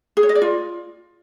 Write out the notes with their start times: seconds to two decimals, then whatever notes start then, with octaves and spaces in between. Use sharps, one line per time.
0.17 G#4
0.23 C#5
0.29 D#5
0.35 D5
0.42 F4